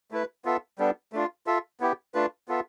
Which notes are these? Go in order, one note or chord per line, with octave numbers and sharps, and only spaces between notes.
A3 E4 B4
B3 F4 A4 E5
G3 B3 D4 A4
A3 D4 F4
F4 A4 E5
B3 E4 G4
A3 D4 F4 B4
B3 F4 A4 E5